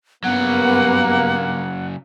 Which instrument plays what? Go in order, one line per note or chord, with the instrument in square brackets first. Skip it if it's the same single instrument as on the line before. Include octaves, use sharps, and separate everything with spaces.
[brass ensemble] G2 A#3 [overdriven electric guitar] C#3 F#3 [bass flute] B3 [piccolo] F#5